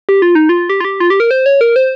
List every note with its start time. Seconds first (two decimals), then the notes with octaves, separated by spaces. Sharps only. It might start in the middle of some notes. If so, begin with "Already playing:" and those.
0.09 G4
0.22 F4
0.35 D#4
0.49 F4
0.70 G4
0.80 F4
0.85 G4
1.00 F4
1.10 G4
1.20 A#4
1.31 C5
1.46 C#5
1.61 A#4
1.76 C5